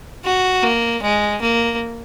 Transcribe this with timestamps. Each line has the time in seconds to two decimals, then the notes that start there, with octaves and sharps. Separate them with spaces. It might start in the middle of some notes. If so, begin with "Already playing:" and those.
0.25 F#4
0.63 A#3
1.02 G#3
1.42 A#3